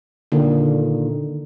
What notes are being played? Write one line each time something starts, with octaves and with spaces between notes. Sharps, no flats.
A#2 D3 D#3